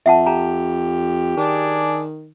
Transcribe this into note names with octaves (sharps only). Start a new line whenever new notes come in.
F2 E5 F#5 A5
G4 A#5
D#3 D4 G#4